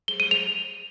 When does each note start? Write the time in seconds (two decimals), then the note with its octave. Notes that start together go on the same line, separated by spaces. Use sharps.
0.08 G7
0.20 D#7
0.31 F7